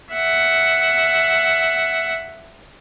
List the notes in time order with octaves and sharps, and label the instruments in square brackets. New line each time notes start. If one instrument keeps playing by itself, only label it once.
[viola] E5 F#5